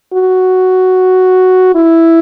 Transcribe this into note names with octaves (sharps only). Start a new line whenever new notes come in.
F#4
E4